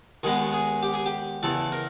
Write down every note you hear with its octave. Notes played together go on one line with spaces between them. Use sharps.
D#2 D#3 G#3 B3 G#4
G#4
G4
G#4
G4
E2 C#3 E3 A4
A#4